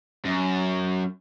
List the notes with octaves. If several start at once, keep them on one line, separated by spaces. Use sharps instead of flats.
F#2